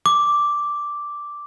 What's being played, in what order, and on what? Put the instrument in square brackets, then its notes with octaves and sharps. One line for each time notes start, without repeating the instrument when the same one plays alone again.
[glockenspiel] D6